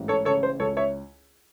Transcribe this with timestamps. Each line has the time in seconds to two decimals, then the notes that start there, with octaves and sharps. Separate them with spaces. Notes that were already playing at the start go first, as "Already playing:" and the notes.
Already playing: A1 G#2
0.08 A4 C#5
0.25 C#3 A4 C#5
0.43 C5
0.59 C#2 A4 C#5
0.77 C#5 E5